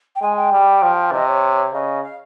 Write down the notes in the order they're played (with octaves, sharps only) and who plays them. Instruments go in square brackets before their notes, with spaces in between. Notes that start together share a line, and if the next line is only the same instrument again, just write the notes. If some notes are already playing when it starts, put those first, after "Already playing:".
[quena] G5
[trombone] G#3 [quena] G#5
[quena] G5
[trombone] G3
F3
[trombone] C3 [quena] D#5
[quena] C#5
[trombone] C#3 [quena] D#5
[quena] F5